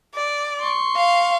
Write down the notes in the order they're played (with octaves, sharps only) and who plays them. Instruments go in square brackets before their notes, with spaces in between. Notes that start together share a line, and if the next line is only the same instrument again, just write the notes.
[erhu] D5
[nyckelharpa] C6 C#6
[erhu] F5